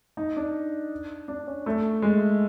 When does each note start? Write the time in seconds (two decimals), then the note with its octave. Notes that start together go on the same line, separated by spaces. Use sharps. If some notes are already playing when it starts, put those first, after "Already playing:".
0.17 D#4
0.36 D4
1.28 D4
1.47 C#4
1.66 A3
2.02 G#3